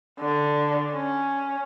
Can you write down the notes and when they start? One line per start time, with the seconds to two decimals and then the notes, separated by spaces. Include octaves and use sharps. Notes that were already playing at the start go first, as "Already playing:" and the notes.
0.20 D3
0.93 C#4